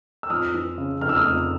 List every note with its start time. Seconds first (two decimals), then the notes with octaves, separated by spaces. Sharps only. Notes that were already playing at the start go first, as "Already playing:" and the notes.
0.23 E6
0.30 F2 D#6 F6
0.54 E3
0.78 C#3
1.01 F1 F6
1.09 E6
1.16 D#6 F6
1.24 F2